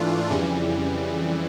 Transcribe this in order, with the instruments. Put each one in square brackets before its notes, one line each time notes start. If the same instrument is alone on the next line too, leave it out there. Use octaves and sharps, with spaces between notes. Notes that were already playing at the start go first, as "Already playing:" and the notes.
Already playing: [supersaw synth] G#2 E3 A3 D4 F4
F2 C#3 E3 G3